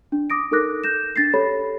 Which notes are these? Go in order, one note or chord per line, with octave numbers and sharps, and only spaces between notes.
D4
D6 D#6 A#6 D7
D#4 A4 A#4 D6 F#6 A#6
G6 A#6 E7
D4 A6 A#6 C7
G4 A4 C#5 B5